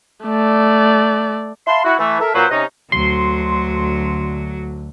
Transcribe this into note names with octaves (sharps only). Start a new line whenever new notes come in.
A3 D5
E5 F5 A5 B5 C6
E4 F#4
E3 A3
A4 A#4 E5
A#2 F#3 B4 C5
C3 C#4 D#4 D#5
D2 D3 F#3 C6